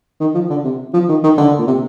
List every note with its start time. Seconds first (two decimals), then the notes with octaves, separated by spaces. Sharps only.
0.20 D#3
0.34 F3
0.50 D3
0.64 C3
0.94 F3
1.09 D#3
1.23 D#3
1.38 D3
1.59 A#2
1.67 C3